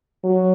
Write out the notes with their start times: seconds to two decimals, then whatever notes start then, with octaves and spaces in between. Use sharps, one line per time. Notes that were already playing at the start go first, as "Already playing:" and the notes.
0.24 F#3